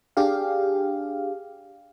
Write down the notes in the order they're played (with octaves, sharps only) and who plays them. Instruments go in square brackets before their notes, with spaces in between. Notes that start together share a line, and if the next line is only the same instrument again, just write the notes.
[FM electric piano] D4 G4 G#4 F5